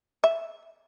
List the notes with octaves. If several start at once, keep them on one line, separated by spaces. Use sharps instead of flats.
E5